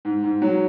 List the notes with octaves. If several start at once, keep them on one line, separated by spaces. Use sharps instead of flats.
G#2
G#2
F#3